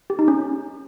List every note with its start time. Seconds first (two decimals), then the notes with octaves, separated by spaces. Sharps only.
0.10 G4
0.19 D#4
0.28 C#4